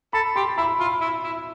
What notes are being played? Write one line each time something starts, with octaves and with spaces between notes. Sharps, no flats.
A4 B5
G4 C6
E4 B5
F4 B5
E4
E4